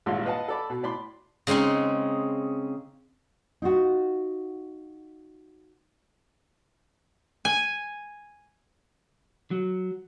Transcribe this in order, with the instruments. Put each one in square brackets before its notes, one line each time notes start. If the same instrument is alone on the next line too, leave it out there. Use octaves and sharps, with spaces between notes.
[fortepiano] G#1 G2 A#2 E4 F4 C6
B4 D#5 F5 F#5 A5
A4 D5 B5
B2
A2 D5 B5 C6
[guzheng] C#3 G#3 C4 D#4 C6
[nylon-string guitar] D#4 F4 F#4
[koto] G#5
[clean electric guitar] F#3